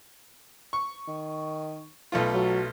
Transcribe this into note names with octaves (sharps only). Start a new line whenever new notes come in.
C#6
D#3
B1 A3 F4
F#3